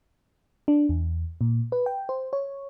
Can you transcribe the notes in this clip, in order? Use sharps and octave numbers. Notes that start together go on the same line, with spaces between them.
D4
E2
A#2
B4
G5
C5
C#5